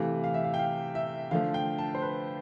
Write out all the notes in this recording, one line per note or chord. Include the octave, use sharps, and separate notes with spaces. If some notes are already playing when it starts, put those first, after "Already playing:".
Already playing: C3 E3 A3 F5
F5
E5
F5
G5
F5
E5
D3 F3 A3 F5
G5
A5
C5
B4